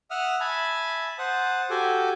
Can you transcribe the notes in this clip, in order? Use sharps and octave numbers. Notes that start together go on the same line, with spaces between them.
E5 F#5 D#6 F6
E5 G#5 A5 B5
C5 F#5 A5 D#6
F#4 G4 A4 G#5 D6